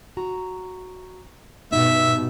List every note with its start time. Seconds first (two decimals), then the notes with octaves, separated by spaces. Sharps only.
0.17 F#4 A#5
1.72 G2 B2 D#4 E5